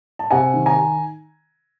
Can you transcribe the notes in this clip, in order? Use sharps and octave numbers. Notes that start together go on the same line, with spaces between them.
A5
C3 F#5 G#5
D#3
G#5 A#5